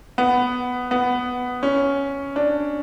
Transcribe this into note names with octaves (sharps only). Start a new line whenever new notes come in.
B3
B3
C#4
D4